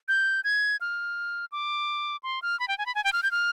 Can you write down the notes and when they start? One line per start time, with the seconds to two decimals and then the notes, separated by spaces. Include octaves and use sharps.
0.08 G6
0.44 G#6
0.81 F6
1.52 D6
2.23 C6
2.42 F6
2.60 B5
2.68 G5
2.78 G#5
2.86 B5
2.95 G#5
3.04 G5
3.13 F6
3.23 G6
3.31 F6